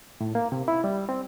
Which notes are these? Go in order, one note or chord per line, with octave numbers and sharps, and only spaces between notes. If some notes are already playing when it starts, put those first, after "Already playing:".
A2
A#3
C3
E4
G3
C4